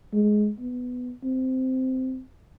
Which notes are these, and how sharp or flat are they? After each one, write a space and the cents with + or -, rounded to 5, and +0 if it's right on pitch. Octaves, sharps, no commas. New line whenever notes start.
G#3 +15
B3 +10
C4 -10